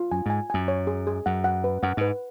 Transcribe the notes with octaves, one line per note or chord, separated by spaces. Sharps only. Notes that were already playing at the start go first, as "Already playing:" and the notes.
Already playing: F4
F#2 G#5
G#2 G#5
F#2 G#5
C#5
G#4
G#4
F#2 F#5
F#5
B4
F#2 F#5
G#2 B4